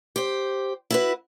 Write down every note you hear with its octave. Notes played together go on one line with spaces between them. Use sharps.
G4 C5
E4 F#4 B4